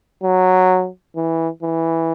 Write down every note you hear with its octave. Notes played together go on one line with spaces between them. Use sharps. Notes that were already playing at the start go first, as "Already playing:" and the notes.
F#3
E3
E3